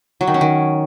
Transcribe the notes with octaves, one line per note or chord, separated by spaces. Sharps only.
F#3
D#3
C#4
D#3